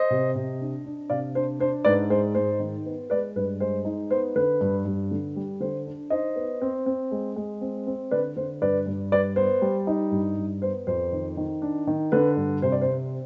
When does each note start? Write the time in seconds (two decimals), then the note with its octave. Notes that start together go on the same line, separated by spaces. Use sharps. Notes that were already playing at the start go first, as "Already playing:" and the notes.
Already playing: C5 D#5
0.10 C3
0.35 C3
0.60 D4
0.85 D4
1.10 C3 D5 F5
1.35 D4 C5
1.60 D4 C5
1.85 G#2 B4 D5
2.10 G#3 C5
2.35 G#2 C5
2.60 D#3
2.86 B3
3.10 G#3 B4 D5
3.36 G2 B4
3.60 G#3 C5
3.85 D#4
4.10 B3 C5
4.36 D3 B4
4.61 G2
4.85 G2
5.11 D3
5.36 G3
5.60 D3 C5
5.86 D4
6.10 D#4 C5 D#5
6.36 B3
6.62 C4
6.86 C4
7.11 G#3
7.36 G#3
7.61 C4
7.87 C4
8.11 D3 B4 D5
8.36 D3 C5
8.62 G2 B4 D5
8.86 G2
9.12 G3 B4 D5
9.36 B3 C5
9.62 G3
9.87 D#4
10.11 G2
10.37 G2
10.62 B3 C5
10.87 F2 C5
11.12 D#3
11.37 D#3
11.62 D4
11.87 D#3
12.12 D3 B4
12.37 G2
12.62 C3 C5
12.72 D5
12.81 C5
12.87 C4